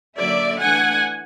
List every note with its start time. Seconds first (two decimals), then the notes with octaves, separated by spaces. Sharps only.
0.17 D3 F#3 A#3 C#4 D5 E5
0.59 E3 A3 D4 F#5 G#5